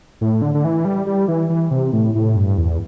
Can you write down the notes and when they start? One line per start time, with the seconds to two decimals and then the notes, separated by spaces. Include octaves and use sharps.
0.21 A2
0.42 D3
0.54 D3
0.64 E3
0.85 G3
1.06 G3
1.28 E3
1.50 E3
1.71 C3
1.93 A2
2.15 A2
2.36 G2
2.57 E2